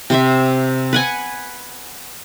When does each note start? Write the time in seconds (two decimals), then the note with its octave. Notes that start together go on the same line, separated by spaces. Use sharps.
0.10 C3 C5 E5
0.93 B4 F#5 G#5